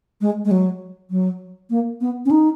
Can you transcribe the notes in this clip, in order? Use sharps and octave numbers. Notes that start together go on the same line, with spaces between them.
G#3
G#3
F#3
F#3
A#3
B3
C#4
D#4